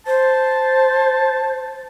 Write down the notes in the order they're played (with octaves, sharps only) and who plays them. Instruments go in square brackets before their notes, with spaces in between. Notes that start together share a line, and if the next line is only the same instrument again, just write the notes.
[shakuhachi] C5 [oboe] A5